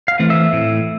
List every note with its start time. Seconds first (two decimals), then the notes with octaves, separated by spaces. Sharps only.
0.08 F5
0.19 E3 A3 C4
0.30 E5
0.53 A2